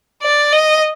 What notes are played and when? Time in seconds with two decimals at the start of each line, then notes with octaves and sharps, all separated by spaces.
0.23 D5
0.53 D#5